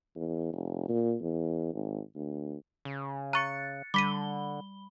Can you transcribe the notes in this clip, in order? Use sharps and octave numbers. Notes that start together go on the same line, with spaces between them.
E2
F1
A#2
E2
G#1
D2
C#3
A#5 C#6 F#6 A6 C#7
D3 G3 B5 D6 B6 D#7 G7